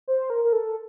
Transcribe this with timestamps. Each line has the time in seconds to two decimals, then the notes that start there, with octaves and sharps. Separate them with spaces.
0.08 C5
0.30 A#4
0.44 A#4
0.53 A4